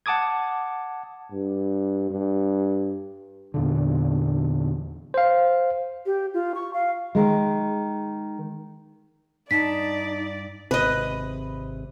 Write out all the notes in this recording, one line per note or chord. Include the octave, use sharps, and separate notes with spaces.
F#5 A5 D6 D#6 G#6
G2
G2
E2 A#2 D3
C5 F5
G4
F4
C#6
F5
D#3 G#3
G2 D#4 D5 G#5 A5 B6
G#1 C3 B4 D#5